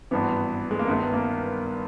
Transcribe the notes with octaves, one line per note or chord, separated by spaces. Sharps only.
G#1 G2 E3 B3
G#3
A#3
G1 G2 D#3 B3
A#3